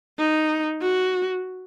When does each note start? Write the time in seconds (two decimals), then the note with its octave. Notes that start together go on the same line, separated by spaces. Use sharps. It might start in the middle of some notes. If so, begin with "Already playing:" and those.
0.19 D#4
0.82 F#4